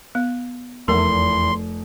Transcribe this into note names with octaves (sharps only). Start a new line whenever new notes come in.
B3
F1 E2 A#4 C6